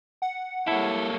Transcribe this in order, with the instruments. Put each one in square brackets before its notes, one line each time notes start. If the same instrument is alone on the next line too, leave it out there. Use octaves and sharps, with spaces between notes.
[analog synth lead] F#5
[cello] G3 C#5 [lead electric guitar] A#3 A4 [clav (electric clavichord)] E4